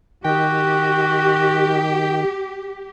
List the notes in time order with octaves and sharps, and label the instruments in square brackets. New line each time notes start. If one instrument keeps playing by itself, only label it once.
[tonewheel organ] D#3 [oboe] F#4 [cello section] G4 [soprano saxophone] G5